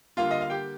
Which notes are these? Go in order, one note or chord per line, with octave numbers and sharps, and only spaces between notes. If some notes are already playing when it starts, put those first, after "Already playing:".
D3 G3 A#3 F4 F5
D#5
F5
G4 G5